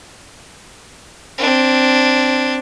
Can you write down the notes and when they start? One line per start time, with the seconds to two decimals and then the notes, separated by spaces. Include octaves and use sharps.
1.38 C4 D4